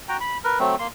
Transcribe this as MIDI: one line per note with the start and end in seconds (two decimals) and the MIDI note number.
0.09 0.17 66
0.09 0.17 79
0.09 0.17 82
0.20 0.38 83
0.44 0.59 70
0.44 0.59 71
0.59 0.75 54
0.59 0.75 57
0.59 0.75 60
0.79 0.87 58
0.79 0.87 84